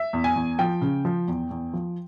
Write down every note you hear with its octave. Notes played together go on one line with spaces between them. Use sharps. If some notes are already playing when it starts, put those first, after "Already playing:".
Already playing: E5
E2
G#5
E2
F3 G5
C#3
F3
E2
E2
F3